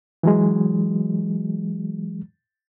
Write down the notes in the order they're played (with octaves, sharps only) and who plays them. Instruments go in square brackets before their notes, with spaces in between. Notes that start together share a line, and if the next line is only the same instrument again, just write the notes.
[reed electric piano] E3 F#3 G#3